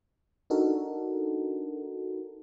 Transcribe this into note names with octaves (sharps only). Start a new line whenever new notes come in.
D4 D#4 F#4 A4 A#4